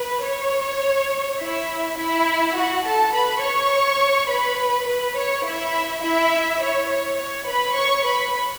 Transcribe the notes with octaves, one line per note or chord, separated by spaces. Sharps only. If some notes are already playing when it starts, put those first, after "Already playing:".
Already playing: B4
C#5
E4 E5
E4 E5
F#4 F#5
A4 A5
B4 B5
C#5 C#6
B4 B5
B4
C#5
E4 E5
E4 E5
C#5
C#5
C#5
B4 B5
C#5 C#6
B4 B5